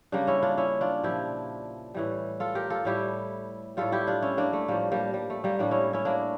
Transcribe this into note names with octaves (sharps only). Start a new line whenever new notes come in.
C#3 G3 A#3 D4
C#4 E4
D4 F4
C#4 E4
D4 F4
A#2 F3 E4 G4
A2 E3 G3
F4 A4
G4 A#4
F4 A4
A2 G3 E4 G4
A2 G3 F4 A4
E4 G4
D4 F4
C#4 E4
A#3 D4
A3
A2 F3 G3 A#3
G3 A#3
G3
A3
G3 A#3
A2 G3 A#3 D4
C#4 E4
C#4 E4
A#3 D4